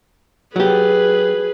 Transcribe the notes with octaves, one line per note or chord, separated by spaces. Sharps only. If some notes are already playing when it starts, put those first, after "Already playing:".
F#3 G4 G#4 B4